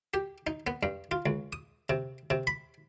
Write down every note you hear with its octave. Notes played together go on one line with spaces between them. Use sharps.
G4
D#4
B3
G2
F4
C#2
D#6
C3
C3
B5